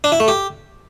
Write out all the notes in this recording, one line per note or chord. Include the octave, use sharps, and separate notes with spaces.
D4
E4
A3
G4